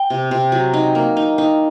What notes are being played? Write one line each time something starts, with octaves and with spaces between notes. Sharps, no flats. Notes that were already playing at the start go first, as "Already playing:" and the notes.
Already playing: G5
C3
C3
F#3
D#4
A#3
D#4
D#4